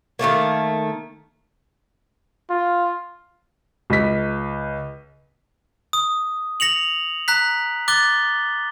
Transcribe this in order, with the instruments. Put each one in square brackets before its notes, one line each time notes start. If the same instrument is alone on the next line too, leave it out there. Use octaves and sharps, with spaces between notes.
[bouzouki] D#3 E3 A3 A#3
[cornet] F4
[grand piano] C#2 B6
[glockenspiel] D#6
A#6 C#7 F7 F#7
A#5 F#6 B6
D6 F#6 A6 G7